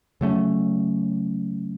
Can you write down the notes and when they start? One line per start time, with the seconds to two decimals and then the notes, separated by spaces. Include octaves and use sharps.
0.21 C#3 F#3 A3 C#4